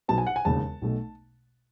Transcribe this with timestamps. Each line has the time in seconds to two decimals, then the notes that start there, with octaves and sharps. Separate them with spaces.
0.08 B1 B2 F#3 B3 A5
0.18 G#5
0.27 F#5
0.36 G#5
0.45 E1 D#2 C#3 A5
0.82 B1 B2 A3